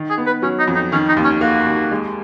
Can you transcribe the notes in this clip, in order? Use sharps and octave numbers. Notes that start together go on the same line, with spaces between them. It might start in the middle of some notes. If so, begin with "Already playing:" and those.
Already playing: D#3
G#4
B3
B4
F#3 C#4
D#4
F2
D#4
D#3 C#4
D#4
D#2
C#4
A#3 F#4
D#2
G#3